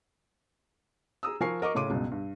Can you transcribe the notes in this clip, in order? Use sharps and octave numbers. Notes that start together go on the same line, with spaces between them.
G#4 A#5 D#6 E6
F3 A#4 G#5 C#6 C7
A#4 D#5 C#6 D6
A2 C#3 C#4 C6 D6 D#7
G1 C#2 B2
G2